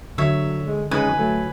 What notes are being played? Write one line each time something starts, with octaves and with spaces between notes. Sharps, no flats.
D3 F#3 C#5 E5
G#3
C#3 G#3 D#4 B4 G#5
F#3 A3